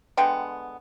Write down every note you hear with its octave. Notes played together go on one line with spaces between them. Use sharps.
D3 G#3 B3 G5